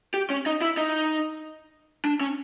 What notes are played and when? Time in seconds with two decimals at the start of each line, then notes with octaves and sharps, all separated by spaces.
0.14 G4
0.30 C#4
0.46 D#4
0.62 E4
0.77 D#4
2.05 D4
2.20 C#4